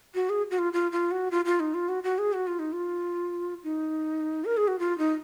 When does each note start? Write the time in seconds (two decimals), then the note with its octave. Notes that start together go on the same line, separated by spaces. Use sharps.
0.15 F#4
0.29 G#4
0.51 F#4
0.59 F4
0.73 F4
0.92 F4
1.11 F#4
1.31 F4
1.45 F4
1.60 D#4
1.74 F4
1.89 F#4
2.03 F#4
2.18 G#4
2.33 F#4
2.47 F4
2.59 D#4
2.73 F4
3.64 D#4
4.45 A#4
4.57 G#4
4.68 F#4
4.79 F4
4.98 D#4